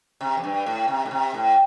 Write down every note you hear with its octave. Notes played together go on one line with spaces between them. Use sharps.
C3
F2
G2
A2
C3
A2
C3
A2